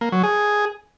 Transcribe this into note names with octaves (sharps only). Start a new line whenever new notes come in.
A#3
F#3
G#4